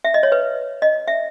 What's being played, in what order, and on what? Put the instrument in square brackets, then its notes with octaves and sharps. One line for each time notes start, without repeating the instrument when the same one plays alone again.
[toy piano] E5
D#5
C#5
B4
D#5
E5